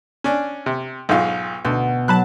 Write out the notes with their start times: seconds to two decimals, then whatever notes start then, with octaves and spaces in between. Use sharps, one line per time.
0.24 C#4 D4
0.66 C3
1.09 B1 G#2 F4
1.65 D2 B2
2.08 F#3 A5 B5 F#6